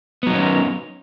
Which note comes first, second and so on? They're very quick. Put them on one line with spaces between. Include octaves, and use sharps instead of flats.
B3 F#3 D#4 C#4